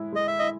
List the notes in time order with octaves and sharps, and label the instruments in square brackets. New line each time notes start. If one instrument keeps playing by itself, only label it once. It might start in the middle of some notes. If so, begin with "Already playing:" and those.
Already playing: [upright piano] A2 G#3 E4
[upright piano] G#3 [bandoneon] D#5
[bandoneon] E5
[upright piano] E4 [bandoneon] D#5